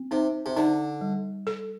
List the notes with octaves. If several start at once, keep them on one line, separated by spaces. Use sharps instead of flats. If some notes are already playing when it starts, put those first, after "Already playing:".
Already playing: C4
C3 D#4
C3
D3 D#4
G3
A4